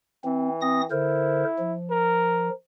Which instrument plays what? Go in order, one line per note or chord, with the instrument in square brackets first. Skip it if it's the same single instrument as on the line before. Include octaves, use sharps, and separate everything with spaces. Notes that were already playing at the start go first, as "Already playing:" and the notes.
[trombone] E3 [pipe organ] C4
[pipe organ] C4 D#6 A#6
[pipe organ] D3 A#4 C5 [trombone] E4
[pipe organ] F3
[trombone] A#4